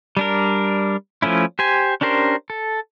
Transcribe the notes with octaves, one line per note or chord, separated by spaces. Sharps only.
G3 D4 A#4
F3 A3 C#4 E4
G4 C5 G#5
C#4 D4 G4 A#4 C5
A4